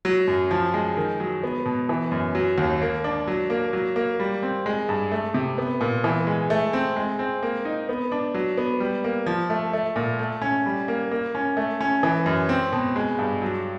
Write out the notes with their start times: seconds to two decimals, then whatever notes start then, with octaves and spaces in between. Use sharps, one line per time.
0.05 F#3
0.28 F#2
0.51 F3
0.74 G#3
0.97 D#3
1.20 F#3
1.43 B3
1.65 B2
1.89 E3
2.12 F#2
2.35 F#3
2.58 D#2
2.82 A#3
3.04 D4
3.27 F#3
3.50 A#3
3.73 F#3
3.96 A#3
4.20 G3
4.43 C4
4.66 G#3
4.89 G2
5.12 A3
5.34 C3
5.58 B3
5.81 A#2
6.04 E3
6.27 G#3
6.50 A3
6.73 C4
6.96 G#3
7.19 C4
7.43 A#3
7.65 D#4
7.89 B3
8.12 D4
8.34 F#3
8.57 B3
8.80 G3
9.04 A#3
9.26 F3
9.50 A3
9.73 A3
9.96 A#2
10.19 A3
10.42 C#4
10.66 G3
10.88 A#3
11.11 A#3
11.35 C#4
11.57 A3
11.81 C#4
12.03 E3
12.26 F#2
12.49 C4
12.72 B2
12.96 G#3
13.19 G2
13.42 F#3